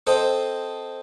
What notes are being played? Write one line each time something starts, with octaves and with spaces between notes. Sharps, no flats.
C4 A4 C5 D#5